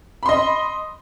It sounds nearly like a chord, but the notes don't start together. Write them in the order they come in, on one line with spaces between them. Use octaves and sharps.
B5 C6 D#5